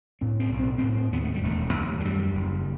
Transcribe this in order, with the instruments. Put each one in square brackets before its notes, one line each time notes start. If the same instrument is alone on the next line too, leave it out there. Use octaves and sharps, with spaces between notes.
[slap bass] A2 C4
C4
B1
C4
C4
A2
C4
D#2 B3
A3
G3
E1 A3
D#2
F#3
F#2 G3
F#1